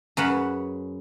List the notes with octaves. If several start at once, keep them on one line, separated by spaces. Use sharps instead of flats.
F#2 C#3 B4 F#5